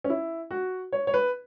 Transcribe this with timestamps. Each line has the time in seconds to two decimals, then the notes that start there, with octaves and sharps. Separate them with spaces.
0.04 C#4
0.10 E4
0.51 F#4
0.92 C#5
1.07 C#5
1.14 B4